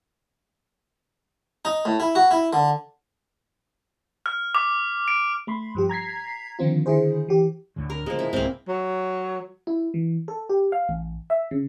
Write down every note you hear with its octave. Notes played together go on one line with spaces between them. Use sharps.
D#4
A2
E4
F#4
E4
D3
F6
D6
D7
A3 B5 C6
G2 F3 G4
A#5 G#6 B6 C7
D3 D#3 F3 C4 F4
D3 D#3 E4 G#4 C5
E3 G4
D2 A2 D3
A#4
A2 C#3 F3 G#3 A#3
E4
C2 G#2 A#3 C4
F#3
E4
E3
A4
G4
F5
A1
E5
C#3